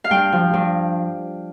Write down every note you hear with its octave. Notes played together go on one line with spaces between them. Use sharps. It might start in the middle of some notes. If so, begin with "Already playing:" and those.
F5
G2 G5
F3
G2